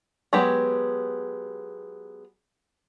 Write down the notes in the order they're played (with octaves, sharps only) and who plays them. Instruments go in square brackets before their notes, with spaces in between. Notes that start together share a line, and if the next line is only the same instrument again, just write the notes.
[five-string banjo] F#3 G#3 B3 G4